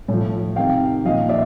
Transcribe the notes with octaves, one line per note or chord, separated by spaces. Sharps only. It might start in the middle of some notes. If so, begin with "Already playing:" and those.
A2 F3
C3 D#3 F5 G5
A#2 F3 D#5 F5
D5 E5